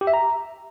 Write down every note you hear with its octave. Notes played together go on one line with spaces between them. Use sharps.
G4
E5
A#5